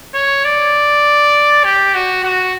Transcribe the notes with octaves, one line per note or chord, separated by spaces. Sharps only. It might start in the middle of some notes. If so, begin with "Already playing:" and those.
C#5
D5
G4
F#4
F#4